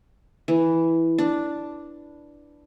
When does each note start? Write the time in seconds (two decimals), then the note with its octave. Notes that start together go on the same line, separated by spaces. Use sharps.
0.48 E3
1.18 D4